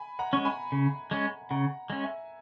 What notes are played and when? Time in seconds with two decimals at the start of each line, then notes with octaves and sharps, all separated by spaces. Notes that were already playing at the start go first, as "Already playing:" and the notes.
Already playing: G#5 B5
0.19 F#5 A#5
0.33 G#3 C#4
0.45 G#5 B5
0.72 C#3
1.11 G#3 C#4
1.50 C#3 F#5 A#5
1.90 G#3 C#4
2.03 E5 G#5